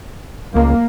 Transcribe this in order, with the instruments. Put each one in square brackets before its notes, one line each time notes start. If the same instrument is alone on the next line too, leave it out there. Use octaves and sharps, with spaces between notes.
[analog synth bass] C#2 [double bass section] A#3